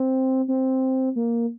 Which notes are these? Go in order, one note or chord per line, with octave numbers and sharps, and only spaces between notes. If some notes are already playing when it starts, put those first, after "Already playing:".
Already playing: C4
C4
A#3